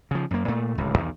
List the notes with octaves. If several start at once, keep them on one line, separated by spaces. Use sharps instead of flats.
C#3 F3
F#2 A#3
A#2 A3
D1 C#2
B1 E2 D#3